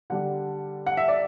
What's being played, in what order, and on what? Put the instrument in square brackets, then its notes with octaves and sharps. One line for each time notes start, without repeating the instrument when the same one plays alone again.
[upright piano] D3 G3 D4 F#5
F#5
E5
D5